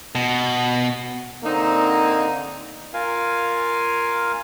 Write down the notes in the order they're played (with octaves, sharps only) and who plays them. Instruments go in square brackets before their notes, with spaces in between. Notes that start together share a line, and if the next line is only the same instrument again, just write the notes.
[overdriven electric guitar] B2
[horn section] D3 A#3 C4 D#4
[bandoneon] F4 A#4 F5 G#5